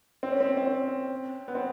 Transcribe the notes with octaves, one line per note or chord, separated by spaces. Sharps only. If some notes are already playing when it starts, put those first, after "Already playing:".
C4
C#4
C4
C4
C#4
B3
C4